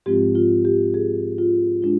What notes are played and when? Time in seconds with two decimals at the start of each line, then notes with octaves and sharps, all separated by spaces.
0.06 G#2 F3 G#3 C4 F4 G4
0.35 F4
0.65 G4
0.94 G#4
1.38 F4
1.83 G#3 D4 F4